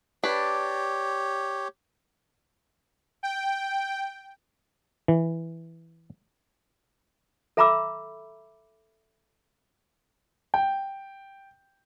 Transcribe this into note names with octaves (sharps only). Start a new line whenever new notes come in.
D4 G4 B4 C#5
G5
E3
A4 E5 A#5 B5 D6 E6
G5